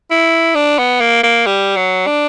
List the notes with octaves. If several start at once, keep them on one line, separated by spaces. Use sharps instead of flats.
E4
D4
B3
A#3
A#3
G3
F#3
D4